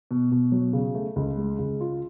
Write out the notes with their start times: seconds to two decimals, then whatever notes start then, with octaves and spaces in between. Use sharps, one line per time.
0.11 B2
0.32 B2
0.52 F#3
0.73 C#3
0.95 A3
1.16 C#2
1.37 G#3
1.59 C#2
1.80 F4